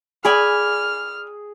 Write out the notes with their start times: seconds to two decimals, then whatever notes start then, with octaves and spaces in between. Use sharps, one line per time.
0.25 G#4 D5 G#5 B5 F6